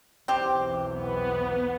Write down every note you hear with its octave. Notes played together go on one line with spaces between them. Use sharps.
B1 E2 E3 C4 G4
B3